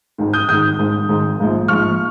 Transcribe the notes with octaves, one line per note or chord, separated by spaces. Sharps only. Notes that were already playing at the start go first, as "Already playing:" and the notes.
G#1 G#2 D#3
D#6 G6
G#1 G#2 D#3 D#6 G6
G#1 G#2 D#3
G#1 G#2 D#3
A#1 G#2 F3
A#1 G#2 F3 C#6 F6